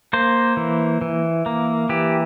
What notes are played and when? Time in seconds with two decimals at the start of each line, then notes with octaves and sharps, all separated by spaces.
0.13 A#3 C5
0.57 E3
1.01 E3
1.46 A#3
1.89 E3 G4